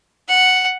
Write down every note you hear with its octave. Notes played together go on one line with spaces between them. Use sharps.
F#5